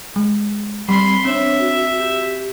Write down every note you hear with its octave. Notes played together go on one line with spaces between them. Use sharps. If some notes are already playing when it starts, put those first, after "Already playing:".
G#3
G3 C4 B5 C6
C4 D4 C#5 E5
F#4
G4